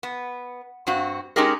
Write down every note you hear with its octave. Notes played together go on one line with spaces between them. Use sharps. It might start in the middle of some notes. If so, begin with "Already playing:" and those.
B3
G2 C4 F#4
G#3 C#4 D#4 G4 G#4 A#4